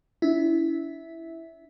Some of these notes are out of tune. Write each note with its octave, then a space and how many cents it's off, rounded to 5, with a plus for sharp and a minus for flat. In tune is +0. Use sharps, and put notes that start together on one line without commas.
C#4 +45 E4 +0 E5 -10